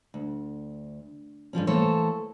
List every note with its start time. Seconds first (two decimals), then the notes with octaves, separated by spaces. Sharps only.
0.14 D2
1.53 G2 D3 F3 C#4
1.67 E3 A3 A#3 A4 C5 C#5